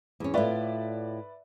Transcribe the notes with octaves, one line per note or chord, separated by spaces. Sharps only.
E2 C#4
A2 F4 B4 D5 E5